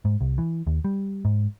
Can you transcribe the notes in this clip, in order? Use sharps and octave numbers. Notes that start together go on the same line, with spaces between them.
G#2
C2
E3
D#2
G3
G#2